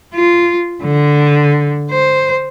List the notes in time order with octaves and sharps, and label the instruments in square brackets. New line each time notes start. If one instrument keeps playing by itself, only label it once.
[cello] F4
D3
C5